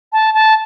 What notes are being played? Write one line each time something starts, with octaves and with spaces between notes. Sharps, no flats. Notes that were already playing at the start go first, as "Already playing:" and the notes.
A5
A5